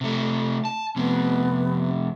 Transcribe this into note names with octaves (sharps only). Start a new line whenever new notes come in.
C3 A3
A5
F2 C3 B3